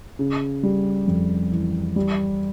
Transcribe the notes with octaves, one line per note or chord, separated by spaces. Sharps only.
C#3
G3
F2
E3
G3